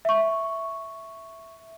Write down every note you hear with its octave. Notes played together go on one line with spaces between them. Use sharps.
E5 C#6